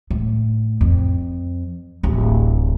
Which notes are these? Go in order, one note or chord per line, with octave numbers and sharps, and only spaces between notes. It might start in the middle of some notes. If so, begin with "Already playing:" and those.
A2
F2
D1 A1